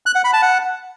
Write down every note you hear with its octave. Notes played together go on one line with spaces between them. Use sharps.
F#6
F#5
B5
A5
F#5